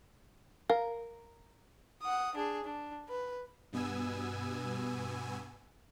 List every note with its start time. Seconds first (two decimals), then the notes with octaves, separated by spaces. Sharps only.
0.70 A#4 F5
2.01 F#5 D#6
2.35 D4 G#4
2.64 D4
3.09 B4
3.73 G2 B2 B3 G#5 E6